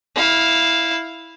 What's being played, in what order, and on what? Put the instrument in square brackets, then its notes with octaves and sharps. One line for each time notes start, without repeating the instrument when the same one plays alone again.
[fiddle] E4 F5